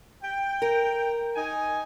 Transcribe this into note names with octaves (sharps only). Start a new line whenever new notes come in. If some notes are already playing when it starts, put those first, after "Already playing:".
G5
A#4
D#4 D#5 G#5